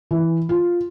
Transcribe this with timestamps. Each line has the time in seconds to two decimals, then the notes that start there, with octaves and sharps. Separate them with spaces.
0.11 E3
0.49 F4